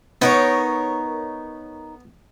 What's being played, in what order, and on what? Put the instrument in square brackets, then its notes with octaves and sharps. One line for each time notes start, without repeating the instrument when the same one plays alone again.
[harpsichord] B3 [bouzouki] D#4 A#4 C#5